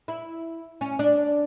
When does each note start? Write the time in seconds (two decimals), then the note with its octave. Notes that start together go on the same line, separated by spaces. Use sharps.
0.08 E4
0.81 C#4
0.99 D4